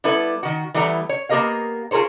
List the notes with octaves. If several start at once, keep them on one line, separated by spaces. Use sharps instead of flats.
G3 B3 E4 A4 B4
D#3 F#4
E3 G3 A3 B3 E4 A#5
C#5
A#3 B3 G4 A#4 D#5 F5
F4 G#4 A#4 C5 C#5